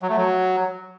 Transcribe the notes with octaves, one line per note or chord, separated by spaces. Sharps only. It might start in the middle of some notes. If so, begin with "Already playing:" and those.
F#3
A3
F#3